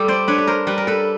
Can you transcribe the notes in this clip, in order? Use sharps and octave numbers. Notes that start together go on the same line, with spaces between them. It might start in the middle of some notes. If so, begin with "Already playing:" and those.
Already playing: G3 G4 A4
C5 D5
D4 B4 C#5
B4
A#4 C5
G3 B4
A#4
A4 B4